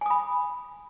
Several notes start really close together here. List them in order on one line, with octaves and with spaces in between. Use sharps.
G#5 D#6 B5